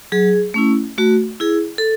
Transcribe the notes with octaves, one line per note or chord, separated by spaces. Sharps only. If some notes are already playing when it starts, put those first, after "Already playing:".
F#3 G#4
A3 C#4 E4
A3 F#4
E4 G#4
A4